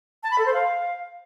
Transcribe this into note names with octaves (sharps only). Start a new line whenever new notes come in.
A5
B5
A4
C5
F5